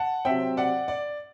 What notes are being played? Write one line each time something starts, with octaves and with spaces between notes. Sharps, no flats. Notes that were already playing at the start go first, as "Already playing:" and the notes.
Already playing: F#5 A5
C3 F#3 C4 E5 G5
D5 F#5
D5